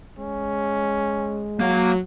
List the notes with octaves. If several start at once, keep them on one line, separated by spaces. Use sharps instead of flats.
G#3 C#4
F#3 A#3 F5